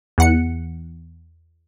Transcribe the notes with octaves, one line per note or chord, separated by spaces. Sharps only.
E2 F#5 C#7